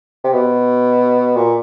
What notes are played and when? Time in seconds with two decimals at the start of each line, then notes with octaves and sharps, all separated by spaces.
0.24 C3
0.33 B2
1.37 A#2